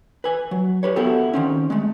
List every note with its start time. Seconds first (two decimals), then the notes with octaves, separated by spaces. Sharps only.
0.24 B4 G#5
0.51 F#3
0.83 G4 B4 C#5
0.96 B3 E4 F#4 G4 A4
1.33 D#3 C4 C#4
1.70 G#3 A3